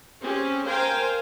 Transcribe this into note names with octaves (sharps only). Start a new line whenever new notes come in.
C4 C#4 G4 G#4
A#4 C5 F5 G5 G#5